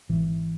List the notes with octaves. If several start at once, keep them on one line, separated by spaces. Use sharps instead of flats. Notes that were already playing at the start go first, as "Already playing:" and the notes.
G#1 E3